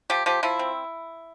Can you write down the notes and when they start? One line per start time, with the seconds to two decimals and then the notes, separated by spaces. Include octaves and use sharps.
0.10 F3 G4
0.26 F3 G4
0.43 F3 E4
0.59 C4